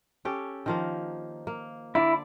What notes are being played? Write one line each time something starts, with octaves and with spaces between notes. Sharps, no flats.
C#4 G4 A4
D#3 F3 A#3
A#3
D3 E4 D5